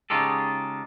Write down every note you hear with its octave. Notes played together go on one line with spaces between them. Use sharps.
C#3 G#3 D#4 F4 G4 A4